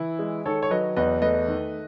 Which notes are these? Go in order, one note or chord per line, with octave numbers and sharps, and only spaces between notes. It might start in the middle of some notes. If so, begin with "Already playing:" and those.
Already playing: E3 E4
G#3
D#3 A4 C#5
C#5
F#3 B4 D#5
E2 B4 D#5
A3 B4 D#5
D#3